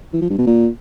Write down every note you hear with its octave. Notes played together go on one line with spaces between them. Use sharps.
E3
F3
G2
B2
A#2